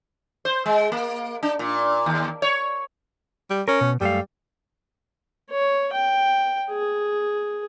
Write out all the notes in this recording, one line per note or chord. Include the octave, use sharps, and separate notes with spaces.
C5
G#3
A#3
D4
A#2
D#2
C#5
G3
C#4 A#4
B2
F#2 G3 A3 F5
C#5
G5
G#4